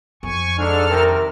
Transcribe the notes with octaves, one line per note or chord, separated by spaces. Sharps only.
F2 G#5 C#6
G#2 D4 A4 F6
C3 D#3 A#4